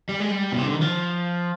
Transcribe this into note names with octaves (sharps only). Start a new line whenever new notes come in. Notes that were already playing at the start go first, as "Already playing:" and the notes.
G3
G#3
G3
B2
C3
D3
D#3
F3